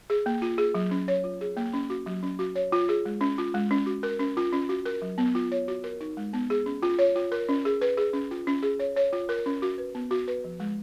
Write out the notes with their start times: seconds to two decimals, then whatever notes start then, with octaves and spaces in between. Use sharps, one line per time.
0.10 G#4
0.26 A#3
0.42 F4
0.58 G#4
0.74 F#3
0.91 C#4
1.08 C#5
1.24 F4
1.41 G#4
1.57 A#3
1.73 C#4
1.90 F#4
2.06 F#3
2.23 C#4
2.39 F#4
2.55 C#5
2.72 F4
2.89 G#4
3.06 G#3
3.21 C#4
3.38 F4
3.54 G#3
3.71 C#4
3.86 F#4
4.03 A#4
4.19 C#4
4.37 F4
4.53 C#4
4.69 F#4
4.86 A#4
5.02 F#3
5.18 B3
5.35 F4
5.52 C#5
5.68 F#4
5.84 A#4
6.01 D#4
6.17 G#3
6.33 B3
6.50 G#4
6.66 C#4
6.83 F4
6.99 C#5
7.16 F4
7.32 A#4
7.49 C#4
7.65 G#4
7.81 B4
7.97 G#4
8.13 C#4
8.31 F4
8.47 C#4
8.63 G#4
8.80 C#5
8.96 C#5
9.13 F4
9.29 A#4
9.46 C#4
9.62 F#4
9.78 B4
9.95 B3
10.11 F#4
10.28 B4
10.44 F3
10.60 G#3